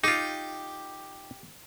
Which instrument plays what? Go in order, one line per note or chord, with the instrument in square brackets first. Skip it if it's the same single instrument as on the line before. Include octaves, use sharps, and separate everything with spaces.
[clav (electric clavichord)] D#4 F4 [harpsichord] G4